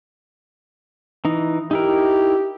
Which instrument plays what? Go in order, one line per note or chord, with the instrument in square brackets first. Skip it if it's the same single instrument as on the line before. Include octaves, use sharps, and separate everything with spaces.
[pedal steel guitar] E3 D#4
[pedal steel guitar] D#4 E4 A#4 [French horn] G4